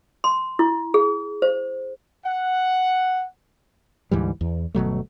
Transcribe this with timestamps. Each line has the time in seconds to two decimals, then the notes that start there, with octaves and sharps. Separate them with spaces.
0.24 C6
0.59 E4
0.94 G#4
1.42 C5
2.24 F#5
4.11 D2 G#2 E3 G3
4.41 E2
4.75 G1 B2 F#3 A3